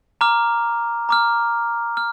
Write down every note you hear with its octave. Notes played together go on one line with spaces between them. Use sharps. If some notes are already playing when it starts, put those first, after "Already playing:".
A#5 D6 F6
A#5 D6 F6
F6